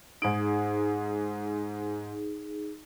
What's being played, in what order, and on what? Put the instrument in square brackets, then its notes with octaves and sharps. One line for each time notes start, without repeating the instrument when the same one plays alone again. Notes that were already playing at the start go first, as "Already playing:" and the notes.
[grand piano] G#2 D7 [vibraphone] D#4 G#4